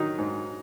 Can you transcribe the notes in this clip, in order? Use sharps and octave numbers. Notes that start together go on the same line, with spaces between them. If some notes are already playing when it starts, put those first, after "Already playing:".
Already playing: D#3 F#3 D#4
G#2